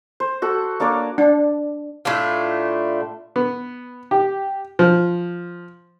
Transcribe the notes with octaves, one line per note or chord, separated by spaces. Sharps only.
C5
F#4 A4
A#3 D4 C#5 D5
D4
A2 A3 D4 F4
B3
G4
F3